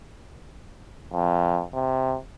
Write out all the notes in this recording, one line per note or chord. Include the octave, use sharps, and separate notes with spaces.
F2
C3